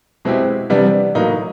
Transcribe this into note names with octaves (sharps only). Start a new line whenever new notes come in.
B2 G#3 C4 E4 G4
C3 E3 G3 B3 D4
A2 F#3 A#3 D#4